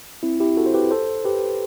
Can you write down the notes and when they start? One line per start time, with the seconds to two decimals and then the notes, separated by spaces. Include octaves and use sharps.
0.23 C4 E4
0.40 E4 G4
0.57 F#4 A4
0.66 C5
0.74 G4 B4
0.91 A4 C5
1.24 G4 B4